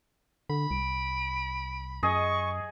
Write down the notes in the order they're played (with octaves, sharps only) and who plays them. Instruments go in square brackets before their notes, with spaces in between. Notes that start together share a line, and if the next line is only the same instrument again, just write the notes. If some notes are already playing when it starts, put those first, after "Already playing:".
[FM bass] D3 [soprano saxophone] B5
[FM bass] C2 [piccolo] D7
[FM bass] F#2 [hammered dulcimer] G#4 D#5 [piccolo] C#6